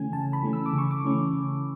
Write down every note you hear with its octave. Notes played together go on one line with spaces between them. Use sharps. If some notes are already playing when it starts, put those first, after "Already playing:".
Already playing: C#3 E3 A3 C#4 G#5
C#3 A5
B5
E3 A3 C#4
E6
D6
C#3
C#6
D6
E3 A3 C#4
C#3